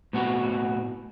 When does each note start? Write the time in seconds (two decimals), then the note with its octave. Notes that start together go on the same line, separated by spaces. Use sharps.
0.13 A2 B3 F#4